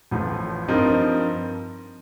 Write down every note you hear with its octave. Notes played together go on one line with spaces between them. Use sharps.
A1 A2 F3
G2 F3 C4 D#4 A#4